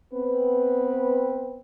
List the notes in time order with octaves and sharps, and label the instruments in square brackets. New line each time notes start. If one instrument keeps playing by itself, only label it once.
[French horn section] B3 C4 B4